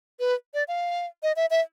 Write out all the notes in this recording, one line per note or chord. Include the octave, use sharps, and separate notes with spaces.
B4
D5
F5
D#5
E5
E5